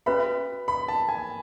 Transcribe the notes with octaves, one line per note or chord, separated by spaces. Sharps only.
C#4 F#4 B4 E5 B5
B5
A5
G#5